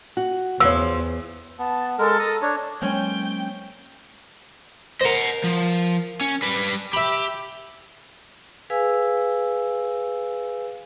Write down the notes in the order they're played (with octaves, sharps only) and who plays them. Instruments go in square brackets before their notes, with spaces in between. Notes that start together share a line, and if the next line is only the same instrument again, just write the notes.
[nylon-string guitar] F#4
[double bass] E2 [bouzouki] F3 [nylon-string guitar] B4 C#5 [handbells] E6
[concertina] B3 [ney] A5
[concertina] G#3 A#4 [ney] A4
[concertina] A#5 D#6
D4 C#5
[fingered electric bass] F#3 G#3 A#3 [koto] C4 C#4 [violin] G5 G6
[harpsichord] A#4 C5 [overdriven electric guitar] D#5 F#5
[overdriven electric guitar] F3
C#4
G3 B4
[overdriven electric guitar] G4 [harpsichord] E5 B5
[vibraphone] G#4 B4 F5 G#5 E6